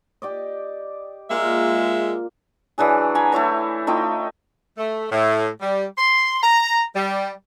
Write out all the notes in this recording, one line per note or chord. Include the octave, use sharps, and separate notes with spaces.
G4 D5 D#5
G#3 A#3 F4 E5 A#5
E3 F#3 D4 G#4
G#5 A#5 B5
A3 E4 C#5 A#5
A3 D#4 F4 G5
A3
A2
G3
C6
A#5
G3